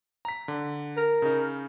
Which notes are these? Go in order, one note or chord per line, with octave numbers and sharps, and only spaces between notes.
A#5 B6
D3
A#4
C#3 D#4